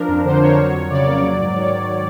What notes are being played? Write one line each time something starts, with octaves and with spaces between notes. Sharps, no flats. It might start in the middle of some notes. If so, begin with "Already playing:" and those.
Already playing: F3 D4 A#4
F2
D3 C5
F2 C#5
F#3
F2
C#3 D5
A#3
F#3
G#2
D#3 C#5